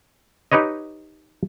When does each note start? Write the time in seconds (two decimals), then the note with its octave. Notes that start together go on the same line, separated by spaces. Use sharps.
0.52 D#4 G4 B4 C#5 D#5